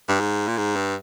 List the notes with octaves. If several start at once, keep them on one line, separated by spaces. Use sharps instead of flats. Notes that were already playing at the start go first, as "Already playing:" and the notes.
G2
G#2
A#2
G#2
G2